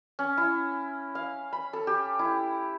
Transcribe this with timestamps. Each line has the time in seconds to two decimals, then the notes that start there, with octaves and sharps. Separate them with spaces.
0.19 C#4
0.37 E4
1.15 F5
1.53 B5
1.73 A4
1.87 G4
2.19 E4